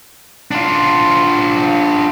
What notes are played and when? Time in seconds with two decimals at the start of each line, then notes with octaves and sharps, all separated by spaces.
0.51 D4 F4